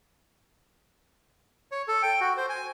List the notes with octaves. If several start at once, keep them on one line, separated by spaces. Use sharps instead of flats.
C#5
A4
G5
F#4
C5
G#5